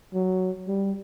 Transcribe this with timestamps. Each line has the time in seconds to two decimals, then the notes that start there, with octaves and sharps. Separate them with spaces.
0.14 F#3
0.68 G3